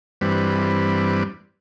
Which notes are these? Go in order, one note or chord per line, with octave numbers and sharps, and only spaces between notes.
G2 E3 G3 C4 B4